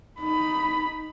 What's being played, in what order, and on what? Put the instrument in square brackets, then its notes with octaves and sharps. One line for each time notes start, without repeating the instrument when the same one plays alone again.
[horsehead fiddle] D#4 B5